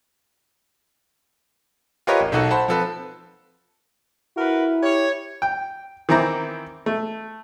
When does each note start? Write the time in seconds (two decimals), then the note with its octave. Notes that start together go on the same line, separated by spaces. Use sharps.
2.07 F4 G4 A#4 B4 C#5 D#5
2.20 A1
2.32 B1 D#4 F#4 A4
2.51 C5 F#5 A5 B5
2.68 F3 C4 A4 B4
4.37 E4 F#4 A#4 B4
4.81 G4 C#5
5.42 G5
6.09 D#3 E3 C4 E4 A#5 D6
6.86 A3